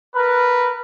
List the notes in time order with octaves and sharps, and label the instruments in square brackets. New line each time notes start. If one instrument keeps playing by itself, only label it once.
[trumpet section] A#4 B4